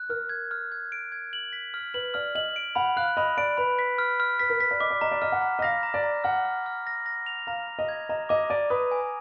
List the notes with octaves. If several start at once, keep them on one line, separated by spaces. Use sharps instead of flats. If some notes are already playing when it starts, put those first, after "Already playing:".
Already playing: F#6
A#4 F6
G#6
F6
G#6
D7
G#6
F#7
B6
F6
B4 F#7
D5 F6
D#5 F#7
D7
F#5 B5
F5 F#6
D#5 B5
D5 D7
B4 B5
B6
F6
F6
B4 B6
A#4
B4 B6
D5
D#5 D6
D5
D#5 A#5
D5
D#5 F6
F#5
A#5
D#5
F5 A#6
A#5
D5
A#5
F#5 F6
F6
F6
A#6
A#6
F7
F5 A#5
A#5
D#5
G#6
D#5 A#5
D#5 D6
D5 D#7
B4 D#6
G#5